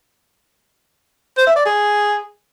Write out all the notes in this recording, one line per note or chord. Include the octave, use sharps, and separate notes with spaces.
C5
E5
D5
G#4